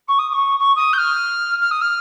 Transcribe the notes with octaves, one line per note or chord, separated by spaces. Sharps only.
C#6
D#6
D#6
C#6
C#6
D#6
G6
F6
F6
D#6
F6